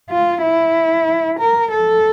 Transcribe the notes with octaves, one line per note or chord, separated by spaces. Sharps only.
F4
E4
A#4
A4